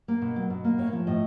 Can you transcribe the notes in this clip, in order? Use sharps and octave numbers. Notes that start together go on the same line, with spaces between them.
A#3
B2
F#3
B2
A#3
A2 C#5
F3
A2 D#5